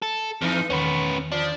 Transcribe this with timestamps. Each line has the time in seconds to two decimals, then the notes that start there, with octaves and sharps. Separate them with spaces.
0.02 A4
0.41 F2 E3 D#4
0.70 E2 D#3 A3 B3 C#4 B4
1.32 F3 D4